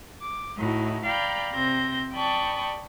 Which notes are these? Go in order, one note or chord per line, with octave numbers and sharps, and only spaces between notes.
D6
A2 D#4 E4 F#4
D5 F5 G5 A#5 B5 G6
C3 C4 G6 A#6
D5 G5 A5 B5 C#6 D#6